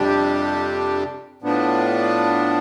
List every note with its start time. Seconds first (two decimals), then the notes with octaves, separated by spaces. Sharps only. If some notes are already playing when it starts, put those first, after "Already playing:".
Already playing: F2 C3 G3 D4 G4
1.42 A2 F3 B3 D4